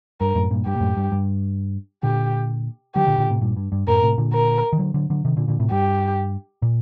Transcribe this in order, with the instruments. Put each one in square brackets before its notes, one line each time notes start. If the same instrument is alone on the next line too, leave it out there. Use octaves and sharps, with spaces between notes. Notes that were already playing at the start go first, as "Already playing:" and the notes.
[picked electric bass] G2 [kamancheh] A#4
[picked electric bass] F#2 A2
G2 A#2
[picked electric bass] G2 [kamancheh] G4
[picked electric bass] A#2
F#2 A2
G2
G2
[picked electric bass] A#2 D3 [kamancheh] G4
[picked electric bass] D3 F#3 [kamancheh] G4
[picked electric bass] A#2 D3
A#2 D3
A2 C3
G2 A#2
G2
G2
[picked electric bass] F#2 A2 [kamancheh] A#4
[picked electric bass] A2 C3
A#2 D3
[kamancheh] A#4
[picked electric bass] D#3
D3 F#3
D3 F#3
D3 F#3
C3 D#3
A#2 D3
A#2 D3
A2 C3
[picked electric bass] G2 [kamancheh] G4
[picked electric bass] A#2